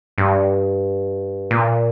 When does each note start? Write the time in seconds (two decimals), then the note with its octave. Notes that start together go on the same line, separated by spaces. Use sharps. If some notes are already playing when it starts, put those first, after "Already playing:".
0.18 G2
1.51 A#2